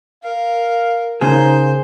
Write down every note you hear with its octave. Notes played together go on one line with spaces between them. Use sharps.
A#4 F5
C#3 A#3 D#4 G#4 C5